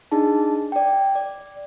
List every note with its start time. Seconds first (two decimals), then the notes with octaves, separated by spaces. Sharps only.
0.12 D4 D#4 G#4 A5
0.72 D5 G5
1.15 D5